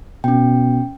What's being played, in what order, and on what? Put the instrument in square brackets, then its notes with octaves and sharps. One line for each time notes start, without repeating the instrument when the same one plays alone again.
[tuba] B2 [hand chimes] C#4 G5